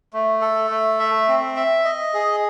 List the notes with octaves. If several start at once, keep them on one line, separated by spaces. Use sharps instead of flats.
A3
A4
A3
E5
C4
E5
D#5
G#4